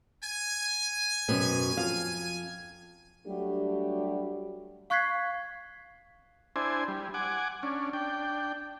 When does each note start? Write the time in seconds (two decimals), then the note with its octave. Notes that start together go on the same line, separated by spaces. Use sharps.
0.23 G#5
1.28 F#2 B2 C4
1.77 F2 F5
3.27 F#3 G3 A3 D4 F#4 G4
4.90 F5 C#6 F#6 G#6 B6 C7
6.56 D4 E4 C5 G#5
6.88 G3
7.14 F#5 G#5 D6
7.63 C#4 D4
7.93 D4 G5